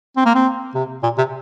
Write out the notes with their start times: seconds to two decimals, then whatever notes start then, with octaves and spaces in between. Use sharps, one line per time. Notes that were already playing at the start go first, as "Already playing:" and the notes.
0.17 C4
0.25 A#3
0.35 C4
0.74 C3
1.03 A#2
1.18 C3